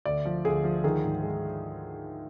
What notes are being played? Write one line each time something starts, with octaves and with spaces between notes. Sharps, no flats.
D2 D5
F3
D2 G#4
F3
D#3 G#4
G#2
G#3